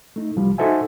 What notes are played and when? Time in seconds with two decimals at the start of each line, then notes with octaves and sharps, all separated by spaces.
0.16 A3 D#4
0.36 C2 F3 G3
0.58 D#4 F#4 A4 C5 E5 G#5